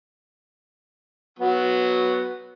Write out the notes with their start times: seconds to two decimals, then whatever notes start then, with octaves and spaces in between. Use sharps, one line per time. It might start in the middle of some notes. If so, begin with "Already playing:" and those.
1.39 F#3 B3